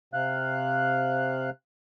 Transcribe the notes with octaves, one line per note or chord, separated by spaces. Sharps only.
C3 F5 F#6